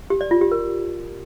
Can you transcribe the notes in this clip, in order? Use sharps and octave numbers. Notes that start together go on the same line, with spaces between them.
G4
D5
F4
G4
A#4